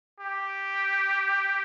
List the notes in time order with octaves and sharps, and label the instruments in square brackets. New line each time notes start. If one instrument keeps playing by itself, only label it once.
[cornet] G4